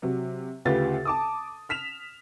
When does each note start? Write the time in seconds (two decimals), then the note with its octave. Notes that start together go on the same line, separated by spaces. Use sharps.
0.02 C3 F#3
0.65 D2 C#3 F4 G4 B4 A6
1.05 A5 D6 D#6
1.69 F6 B6 E7 F7